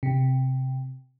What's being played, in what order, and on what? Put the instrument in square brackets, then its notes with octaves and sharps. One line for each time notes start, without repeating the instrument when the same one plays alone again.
[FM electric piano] C3